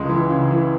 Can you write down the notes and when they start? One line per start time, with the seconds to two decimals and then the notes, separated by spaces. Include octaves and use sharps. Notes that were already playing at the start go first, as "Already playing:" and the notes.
Already playing: C#2 C#3 G#3
0.09 E3
0.30 C#3
0.51 E3